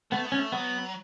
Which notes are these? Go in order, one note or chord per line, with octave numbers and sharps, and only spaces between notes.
A3 B3
B3
C#4
A3
F#3 B3